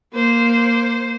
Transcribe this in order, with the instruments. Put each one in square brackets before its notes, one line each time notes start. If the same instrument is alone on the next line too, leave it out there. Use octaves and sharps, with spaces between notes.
[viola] A#3 C5